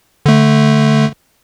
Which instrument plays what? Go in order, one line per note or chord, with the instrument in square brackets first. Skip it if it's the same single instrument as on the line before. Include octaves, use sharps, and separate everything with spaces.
[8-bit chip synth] D3 A3